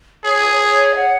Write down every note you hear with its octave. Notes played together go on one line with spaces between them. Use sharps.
G#4 C#5
C#5
F#5